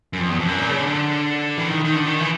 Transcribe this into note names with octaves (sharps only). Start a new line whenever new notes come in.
F#2
F2
E2
F2
F#2
A#2
C#3
D3
E3
D#3
D#3
D3
D#3
E3